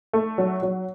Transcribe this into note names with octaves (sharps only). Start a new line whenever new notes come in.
A3
F#3
F#3